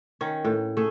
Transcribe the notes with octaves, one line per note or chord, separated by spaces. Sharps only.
D#3 C#4
A2
A3 G#4